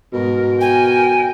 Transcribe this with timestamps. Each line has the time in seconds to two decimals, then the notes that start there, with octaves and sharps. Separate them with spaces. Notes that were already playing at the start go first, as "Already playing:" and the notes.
0.13 G#2 B2 A#4
0.61 A#4 G5 G#5